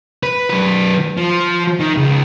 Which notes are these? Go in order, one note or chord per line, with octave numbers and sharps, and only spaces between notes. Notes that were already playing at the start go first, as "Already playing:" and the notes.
B4
F#2 B4
F3
D#3
C#2